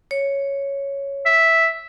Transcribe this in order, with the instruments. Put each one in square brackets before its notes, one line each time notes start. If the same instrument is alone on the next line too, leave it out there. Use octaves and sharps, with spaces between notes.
[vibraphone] C#5
[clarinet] E5